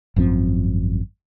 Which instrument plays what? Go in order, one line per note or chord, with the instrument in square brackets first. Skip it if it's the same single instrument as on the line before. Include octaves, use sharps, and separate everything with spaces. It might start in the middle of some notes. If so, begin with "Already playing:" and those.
[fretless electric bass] G#1 F#2 F3 C4